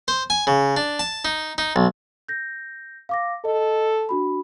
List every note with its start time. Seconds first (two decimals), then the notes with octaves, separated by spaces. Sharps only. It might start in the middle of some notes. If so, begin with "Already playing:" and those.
0.08 C5
0.30 G#5
0.47 C#3
0.77 D4
0.99 A5
1.25 D#4
1.58 D#4
1.76 B1
2.28 G6 A#6
3.09 F5 D6 A#6
3.45 A4 D#5
4.09 D4 F#4 B5